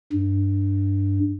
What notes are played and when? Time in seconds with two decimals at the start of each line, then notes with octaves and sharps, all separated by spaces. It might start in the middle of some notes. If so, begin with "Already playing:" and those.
0.13 G2